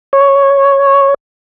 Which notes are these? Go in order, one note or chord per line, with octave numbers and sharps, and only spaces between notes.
C#5